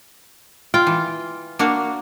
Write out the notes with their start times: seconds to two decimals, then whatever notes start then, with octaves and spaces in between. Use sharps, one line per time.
0.74 F4 G5
0.87 E3
1.59 A#3 D4 F#4